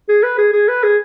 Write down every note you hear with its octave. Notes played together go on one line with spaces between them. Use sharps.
G#4
B4
G#4
G#4
B4
G#4